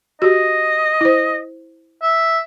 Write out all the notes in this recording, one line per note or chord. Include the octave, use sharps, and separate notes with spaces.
F#4 G4 D#5
E4 C5
E5